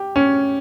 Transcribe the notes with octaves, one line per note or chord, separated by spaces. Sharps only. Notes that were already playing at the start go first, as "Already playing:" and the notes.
Already playing: G4
C#4